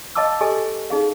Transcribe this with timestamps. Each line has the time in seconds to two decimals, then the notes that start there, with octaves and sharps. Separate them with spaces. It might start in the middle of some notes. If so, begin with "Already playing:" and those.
0.15 D#5 F5 A5 D6 E6
0.41 G4 A4 D#5 G#5
0.90 D#4 G#4 F5